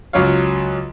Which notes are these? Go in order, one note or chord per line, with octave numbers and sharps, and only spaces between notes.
C#2 F#3 F4 C#5 F5